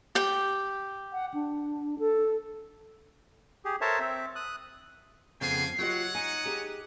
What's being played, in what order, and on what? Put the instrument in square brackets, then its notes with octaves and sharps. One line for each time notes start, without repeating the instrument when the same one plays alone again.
[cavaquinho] G4 G5
[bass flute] F#5
D4
A4
[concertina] G4 G#4
A4 A#4 C5 C#5 E5 A5
C4 E5
D#6 F#6
[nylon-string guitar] F2 [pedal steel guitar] C#3 B3 [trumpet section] F5 G5 G#5 [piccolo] C7
[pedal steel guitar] F#3 [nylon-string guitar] F4 G4 D#5 [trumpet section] C#5 F#5
[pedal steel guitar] D#4 [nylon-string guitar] G#5 [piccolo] D#7
[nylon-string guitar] G4 G#4